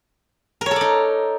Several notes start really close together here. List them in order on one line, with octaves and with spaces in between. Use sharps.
A#4 C#5 A4 D5 D#4